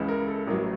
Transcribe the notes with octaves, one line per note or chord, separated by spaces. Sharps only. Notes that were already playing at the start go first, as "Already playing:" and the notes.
Already playing: C#2 C#3 E3
A#4
A4
A1 A2 F#3 A#4